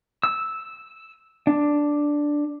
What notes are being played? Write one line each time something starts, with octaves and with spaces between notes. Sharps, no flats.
E6
D4